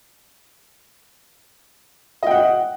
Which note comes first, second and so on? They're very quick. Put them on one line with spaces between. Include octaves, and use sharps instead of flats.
D#5 G5 F#5